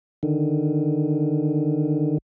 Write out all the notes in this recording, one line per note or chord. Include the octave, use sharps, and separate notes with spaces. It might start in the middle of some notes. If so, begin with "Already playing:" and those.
D3 D#3